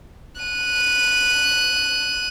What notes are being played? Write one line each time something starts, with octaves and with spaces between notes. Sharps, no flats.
F#6 D#7